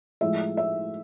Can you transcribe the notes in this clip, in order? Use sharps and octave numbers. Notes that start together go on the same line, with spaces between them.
A2 F3 G#3 E5
E5